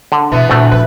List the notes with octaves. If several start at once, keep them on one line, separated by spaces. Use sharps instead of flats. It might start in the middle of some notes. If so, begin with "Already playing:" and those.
D3
B2 E3 B3
D2 A#2 A3
F3 C4 B4